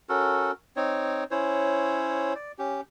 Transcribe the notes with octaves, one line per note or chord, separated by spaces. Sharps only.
C#4 F#4 A4 A#4
C4 D#4 C#5
C#4 E4 C5 C#5
D5
C#4 G4